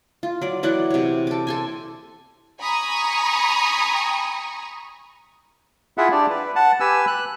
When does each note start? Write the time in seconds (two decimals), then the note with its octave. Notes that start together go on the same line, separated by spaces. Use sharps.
0.23 F4
0.41 F#3 D5
0.63 E3 F#3 D5 F#5
0.90 C3 C#5
1.27 A4 D6
1.47 A4 C5 G#5
2.59 G#5 A#5 B5 C#6 D#6
5.98 E4 F4 G#4 E5 F#5
6.12 D4 G4 D5
6.30 B4
6.56 F#5 A5
6.80 G4 B4 G#5 E6
7.07 F#6